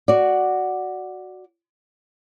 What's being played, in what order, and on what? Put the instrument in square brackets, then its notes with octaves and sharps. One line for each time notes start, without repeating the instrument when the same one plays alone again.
[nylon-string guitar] F#4 D5